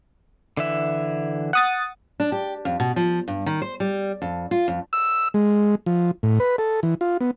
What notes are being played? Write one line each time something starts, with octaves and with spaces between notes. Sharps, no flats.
D3 E3 E5
F#5 D#6 A6
D4
G4
F2
B2
F3
G2
D#3
C5
G3
F2
F4
F2
E6
G#3
F3
A2
B4
A4
E3
F4
B3